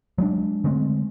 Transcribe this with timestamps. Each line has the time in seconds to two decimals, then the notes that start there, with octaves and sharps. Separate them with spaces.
0.18 F#3 G#3 A#3 D4
0.64 D3 G#3 A3 C4